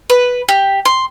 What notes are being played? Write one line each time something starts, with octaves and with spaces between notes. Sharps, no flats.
B4
G4
C6